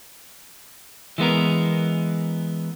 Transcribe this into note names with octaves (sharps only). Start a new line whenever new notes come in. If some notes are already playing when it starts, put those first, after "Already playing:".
E3 G#3 B3 A#4